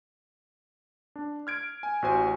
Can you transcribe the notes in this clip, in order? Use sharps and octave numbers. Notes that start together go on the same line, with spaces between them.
D4
F6 G#6 D7
G#5
A1 F#4 C5 G#5